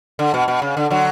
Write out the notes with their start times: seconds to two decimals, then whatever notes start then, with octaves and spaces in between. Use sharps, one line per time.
0.19 D3
0.34 B2
0.48 B2
0.62 C#3
0.77 D3
0.90 D3 F#3